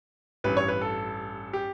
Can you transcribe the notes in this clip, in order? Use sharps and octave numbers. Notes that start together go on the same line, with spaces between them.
A1 G2 E3 B4
C#5
B4
A4
G4